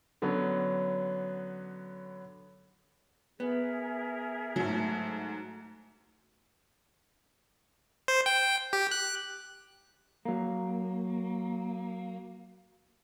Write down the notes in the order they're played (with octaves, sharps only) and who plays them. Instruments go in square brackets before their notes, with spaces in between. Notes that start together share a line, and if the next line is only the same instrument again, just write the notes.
[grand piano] D3 F#3 B3 C#4
[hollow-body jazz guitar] B3 [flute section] G#4 A#4 E5
[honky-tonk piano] G#2 F#3 [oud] A3
[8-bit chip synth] C5
G5
G4
F#6
[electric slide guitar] F#3 A#3